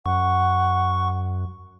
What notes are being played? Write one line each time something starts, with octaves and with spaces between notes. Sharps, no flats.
F#2 F#5 C#6